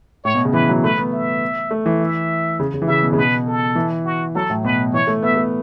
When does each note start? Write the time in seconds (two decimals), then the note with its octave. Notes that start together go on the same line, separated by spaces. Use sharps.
0.24 A2 C#5
0.35 B2
0.45 C#3
0.53 E3 B4
0.69 F#3
0.83 A3 B4
0.98 B3
1.12 E5
1.71 A3
1.86 E3
2.00 E5
2.60 C#3
2.74 C#3
2.82 E3
2.88 C#3 E5
3.03 B2
3.13 C#3
3.17 B2 B4
3.47 A4
3.75 E3
4.05 F#4
4.35 F#3 A4
4.50 A2
4.64 B2 B4
4.93 E3 C#5
5.07 A3
5.23 B3 E5
5.37 A3